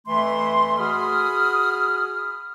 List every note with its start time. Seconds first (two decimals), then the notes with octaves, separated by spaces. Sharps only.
0.07 F2 E3 A3 E5 C6
0.78 F#4 G#4 B5 D#6 F6